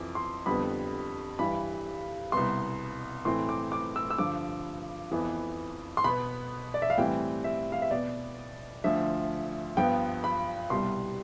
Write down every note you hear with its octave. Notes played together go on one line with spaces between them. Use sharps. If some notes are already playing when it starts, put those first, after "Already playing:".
Already playing: F2 E3 D6
C6
F2 D3 G3 B3 B5
G2 E3 G3 B5
C2 B2 B3 C6
A2 E3 A3 C4 C6
D6
D6
E6
E6
G2 D3 F3 D6
F2 E3 B3
C6
B2 B3 B5
D5
E5
F5
A2 E3 G3 C4 G5
E5
F5
E5
B2 B3 D5
D2 D3 F3 E5
G2 F3 B3 G5
B5
C2 B2 G3 C6